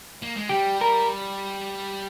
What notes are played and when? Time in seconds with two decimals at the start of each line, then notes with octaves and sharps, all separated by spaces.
0.22 A#3
0.36 G#3
0.49 G3 G4
0.81 A#4